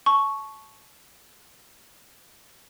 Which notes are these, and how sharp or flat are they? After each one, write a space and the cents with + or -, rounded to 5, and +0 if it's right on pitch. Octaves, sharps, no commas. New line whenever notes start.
A5 -25 C#6 +0